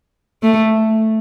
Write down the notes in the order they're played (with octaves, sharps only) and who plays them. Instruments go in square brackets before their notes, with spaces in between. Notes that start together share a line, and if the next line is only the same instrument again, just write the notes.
[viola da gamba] A3